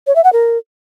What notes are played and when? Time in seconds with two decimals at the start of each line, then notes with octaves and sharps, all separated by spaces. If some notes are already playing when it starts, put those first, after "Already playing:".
0.07 C#5
0.16 E5
0.24 F#5
0.33 A#4